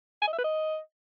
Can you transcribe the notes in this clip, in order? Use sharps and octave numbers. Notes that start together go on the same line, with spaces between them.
G#5
D#5
E5
B4
D#5